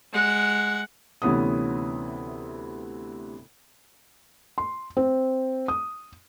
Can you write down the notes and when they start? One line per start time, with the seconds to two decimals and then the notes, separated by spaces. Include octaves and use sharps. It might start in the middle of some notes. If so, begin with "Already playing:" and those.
0.13 G#3 F#5
1.22 D2 C3 E3 B3 C#4 D#6
4.58 C6
4.97 C4
5.68 D#6